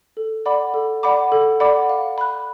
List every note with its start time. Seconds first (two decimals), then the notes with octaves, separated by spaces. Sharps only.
0.17 A4
0.46 D5 F#5 B5 D6
0.74 A4
1.03 D5 F#5 B5 D6
1.32 A4
1.60 D5 F#5 B5 D6
1.89 F5
2.18 B5 F#6